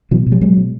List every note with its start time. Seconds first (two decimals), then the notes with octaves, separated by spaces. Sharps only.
0.11 B2 E3 F#3
0.26 B2
0.32 F3 G3
0.41 B2 F#3 G#3
0.57 B2